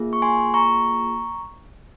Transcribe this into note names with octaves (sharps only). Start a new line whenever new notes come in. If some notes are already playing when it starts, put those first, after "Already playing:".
Already playing: A#3 F4 G#4
C#6
G#5 C6
A#5 C#6